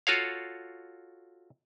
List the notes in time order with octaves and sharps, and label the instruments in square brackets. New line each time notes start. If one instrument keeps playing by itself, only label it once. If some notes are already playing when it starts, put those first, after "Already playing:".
[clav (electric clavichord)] F4 F#4 A4 C#5 F5